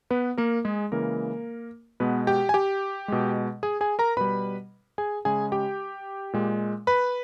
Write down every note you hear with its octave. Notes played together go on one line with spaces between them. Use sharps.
B3 B4
A#3 A#4
G#3 G#4
C#3 E3 G#3 A#3 A#4
B2 G#3 B3 B4
G4 G5
G#5
G4 G5
B2 G#3
G#4 G#5
G#4 G#5
A#4 A#5
B2 G3 B4 B5
G#4 G#5
C#3 G#3 G#4 G#5
G4 G5
A#2 G#3
B4 B5